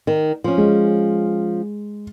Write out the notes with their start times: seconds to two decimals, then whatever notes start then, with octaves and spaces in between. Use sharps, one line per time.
0.07 D#3
0.44 F3 C#4
0.58 G#3